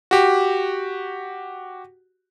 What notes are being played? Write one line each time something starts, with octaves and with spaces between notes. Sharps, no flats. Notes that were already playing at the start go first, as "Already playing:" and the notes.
F#4 G4